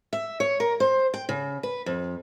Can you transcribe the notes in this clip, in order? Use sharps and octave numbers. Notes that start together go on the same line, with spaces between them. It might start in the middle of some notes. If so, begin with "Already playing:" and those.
E5
C#5
A#4
C5
G5
C#3
B4
F2